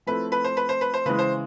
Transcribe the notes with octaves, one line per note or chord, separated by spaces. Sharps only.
F3 A3 C4 E4 A4 B4
B4
C5
B4
C5
B4
C5
C#3 E3 G#3 B4
C5